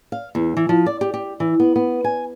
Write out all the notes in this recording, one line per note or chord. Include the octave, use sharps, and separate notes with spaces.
F5
E2
E3
F3
D5
G4
G4
E3
B3
B3
G#5